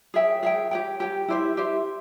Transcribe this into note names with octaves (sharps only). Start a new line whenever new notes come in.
G#4 C#5 E5 G5
G#4 C#5 E5 G5
G4 C#5 G5
G4 C#5 G5
E4 G4 C5 E5
E4 G4 C5 E5